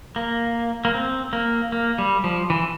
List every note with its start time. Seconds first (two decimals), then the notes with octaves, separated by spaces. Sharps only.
0.16 A#3
0.85 A#3
0.94 C4
1.33 A#3
1.72 A#3
1.98 G3
2.24 F3
2.50 E3